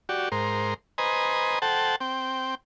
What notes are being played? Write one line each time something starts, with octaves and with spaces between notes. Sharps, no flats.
F#4 G4 D5
G#2 A#4 C5
B4 C5 D#5 G#5 A#5
A4 C5 F#5 G5 A5
C4 G5